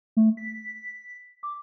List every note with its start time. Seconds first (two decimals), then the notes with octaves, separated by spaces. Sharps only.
0.17 A3
0.37 B6
1.43 D6